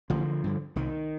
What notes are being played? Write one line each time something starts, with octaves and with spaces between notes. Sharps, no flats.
A1 D3 F3
G2 D3
C2 D#3